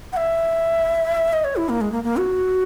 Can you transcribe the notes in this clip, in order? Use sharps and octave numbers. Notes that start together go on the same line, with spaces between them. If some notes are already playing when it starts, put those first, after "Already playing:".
F#5
E5
D#5
C#5
E4
A#3
G#3
A#3
A#3
F#4